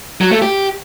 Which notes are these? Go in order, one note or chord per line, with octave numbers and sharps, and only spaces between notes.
F#3
A3
G4